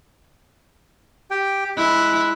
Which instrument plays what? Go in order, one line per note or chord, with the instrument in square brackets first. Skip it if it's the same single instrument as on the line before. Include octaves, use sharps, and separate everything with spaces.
[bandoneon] G4 G5
[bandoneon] G#3 F#6 [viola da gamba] E4